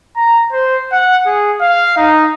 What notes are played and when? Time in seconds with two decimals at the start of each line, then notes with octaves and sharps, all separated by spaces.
0.16 A#5
0.52 C5
0.92 F#5
1.26 G#4
1.61 F5
1.97 D#4